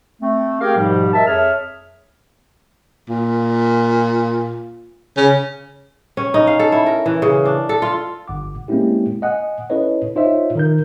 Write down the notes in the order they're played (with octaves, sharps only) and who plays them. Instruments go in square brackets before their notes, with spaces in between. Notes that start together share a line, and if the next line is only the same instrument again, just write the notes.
[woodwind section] A3 C4
G4 G#4 A#4 F5 G5
G#2 B2 F3 G3 G4
A#4 D#5 E5 A5
F2 G#4 C#5 E5 F6
[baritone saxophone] A#2
C#3
[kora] C#4
D#4
F5
A4
E4
A#4
E3
C#3
D4
A4
F4
[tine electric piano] G1 F#5 D6
G#3 A#3 C4 C#4 E4 G4
D#5 F#5 G#5 D#6
C#4 E4 A4 B4 C#5 D#5
D#4 F4 C5 C#5 D#5 E5
D#3 A#4 G6